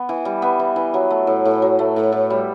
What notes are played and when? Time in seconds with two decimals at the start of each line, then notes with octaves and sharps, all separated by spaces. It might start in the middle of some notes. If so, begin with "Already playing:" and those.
Already playing: B3
0.09 E3
0.25 G3
0.42 B3
0.59 E3
0.76 E3
0.94 F#3
1.11 A3
1.27 A2
1.45 A2
1.62 F#3
1.79 A3
1.96 A2
2.12 A2
2.30 G3